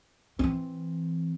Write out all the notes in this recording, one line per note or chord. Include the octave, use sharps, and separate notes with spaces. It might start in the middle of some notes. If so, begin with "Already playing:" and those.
E3 C4